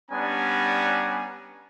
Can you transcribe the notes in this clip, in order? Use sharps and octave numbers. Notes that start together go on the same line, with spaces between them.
G3 B3 C#4 D4 G#5 A#5